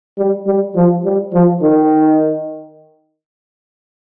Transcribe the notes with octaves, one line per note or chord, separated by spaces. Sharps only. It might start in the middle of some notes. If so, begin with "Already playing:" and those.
G3
G3
F3
G3
F3
D#3